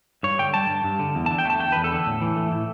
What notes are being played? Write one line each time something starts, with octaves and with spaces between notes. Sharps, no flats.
G2 C#5
D3 G5
G3 A5
G2
G2
D3
E2
D3 A5
G5
A3 A5
E2 G5
E2 B4
A4
D3
A2
E3
A3
A2